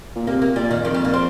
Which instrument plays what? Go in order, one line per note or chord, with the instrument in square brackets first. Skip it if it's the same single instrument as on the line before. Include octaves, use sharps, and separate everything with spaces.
[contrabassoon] A#2
[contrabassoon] C3 [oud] A#3
[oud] A#3
[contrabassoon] A#2 [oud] G3
[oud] D#3
[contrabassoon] F2 [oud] D#3
[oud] G3
A#3
C4